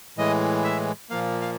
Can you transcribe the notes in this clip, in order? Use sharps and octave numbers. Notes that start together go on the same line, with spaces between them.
A2 E3 G#3 D#5
E5
A#2 F3 A#3 F5
F5